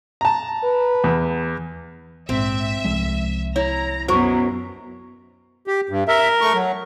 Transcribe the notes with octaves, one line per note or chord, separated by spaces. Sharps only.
A5 A#5
B4
E2
A#1 G#2 C4 E5
C2 F3 G#3
E4 C#5 A#5
F#2 B2 F#3 A#4 C5 C#6
G4
G2
A#4 E5
A3 C#6
F#3